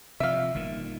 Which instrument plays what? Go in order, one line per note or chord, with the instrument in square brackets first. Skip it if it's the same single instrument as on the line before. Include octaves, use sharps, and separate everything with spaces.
[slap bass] C3 F3 [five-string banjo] E5 F5
[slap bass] G1 A#2 D#3